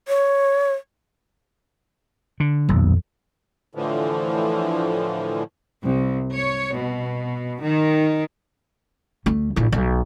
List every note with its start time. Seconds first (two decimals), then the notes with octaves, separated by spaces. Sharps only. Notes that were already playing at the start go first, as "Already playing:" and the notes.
0.08 C#5
2.40 D3
2.69 D#1 B1 F2
3.75 A2 D3 E3 F3
5.83 C2
6.32 C#5
6.76 B2
7.62 D#3
9.26 D2 A3
9.56 A#1 E4
9.72 B1